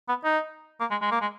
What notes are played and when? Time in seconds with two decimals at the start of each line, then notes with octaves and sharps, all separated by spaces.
0.09 B3
0.25 D#4
0.80 A#3
0.91 G#3
1.02 G#3
1.11 A#3
1.21 G#3